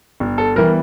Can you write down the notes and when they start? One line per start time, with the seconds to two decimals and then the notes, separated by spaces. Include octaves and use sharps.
0.20 G1
0.38 A4
0.56 E3 G3 B3 A#4